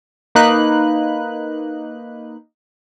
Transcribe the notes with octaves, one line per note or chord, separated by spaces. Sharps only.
A#3 D#4 B4 F#6